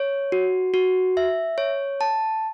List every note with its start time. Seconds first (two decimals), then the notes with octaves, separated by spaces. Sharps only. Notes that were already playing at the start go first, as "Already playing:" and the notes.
Already playing: C#5
0.32 F#4
0.74 F#4
1.17 E5
1.58 C#5
2.01 A5